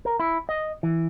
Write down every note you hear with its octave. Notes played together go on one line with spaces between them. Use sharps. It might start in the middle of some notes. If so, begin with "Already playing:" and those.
A#4
E4
D#5
E3